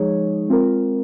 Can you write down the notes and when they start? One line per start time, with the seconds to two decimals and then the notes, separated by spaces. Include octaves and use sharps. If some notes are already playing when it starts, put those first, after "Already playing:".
Already playing: F3 G#3 D#4 G#4 C#5
0.49 G#3 C4 F4 A#4